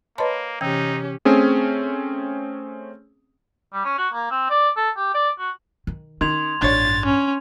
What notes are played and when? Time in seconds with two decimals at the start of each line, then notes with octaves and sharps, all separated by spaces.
0.18 A#3 B4 C#5 D#5 A5 B5 C6
0.61 C3 E3 C#4 D#4 G4 G5
1.25 A3 C4 C#4 G#4
3.73 G3
3.85 C#4
3.98 F#4
4.13 A#3
4.31 C4
4.50 D5
4.76 A4
4.97 G4
5.14 D5
5.39 F#4
5.87 D#3
6.21 D#3 C#4 C6 G#6 F7
6.62 A1 G2 D4 C#5 A6
7.06 C#4